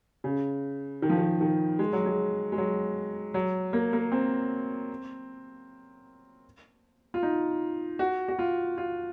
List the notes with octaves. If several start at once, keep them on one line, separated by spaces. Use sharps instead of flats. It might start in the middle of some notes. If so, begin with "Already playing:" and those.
C#3
D#3
F3
D#3
D#3
G#3
F#3
G#3
G#3
F#3
F#3
A#3
A#3
C4
F4
D#4
F#4
F#4
F4
F4